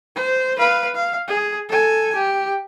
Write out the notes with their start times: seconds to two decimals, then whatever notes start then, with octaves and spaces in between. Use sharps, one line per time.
0.16 C5
0.58 B4 F5
0.95 F5
1.28 G#4
1.69 A4 G#5
2.16 G4